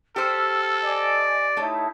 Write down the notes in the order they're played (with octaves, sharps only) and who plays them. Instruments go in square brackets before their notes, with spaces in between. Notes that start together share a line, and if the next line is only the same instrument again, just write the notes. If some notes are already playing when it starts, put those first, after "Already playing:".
[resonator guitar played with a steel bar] G4 C5 [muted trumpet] A4 [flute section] E6 F6
[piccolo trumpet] D5 [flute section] D#5 G#5
[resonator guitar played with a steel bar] A3 A4 [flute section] D#4 E4 C#5